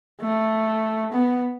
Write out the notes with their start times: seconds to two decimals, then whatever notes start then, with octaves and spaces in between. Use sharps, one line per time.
0.21 A3
1.12 B3